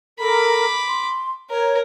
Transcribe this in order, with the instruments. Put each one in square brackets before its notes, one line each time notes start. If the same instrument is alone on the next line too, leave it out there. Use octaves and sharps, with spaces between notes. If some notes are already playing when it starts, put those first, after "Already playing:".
[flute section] A4 A#4 A#5 [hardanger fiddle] B5 D6
[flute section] C6
[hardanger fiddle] A#4 [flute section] C#5 A#5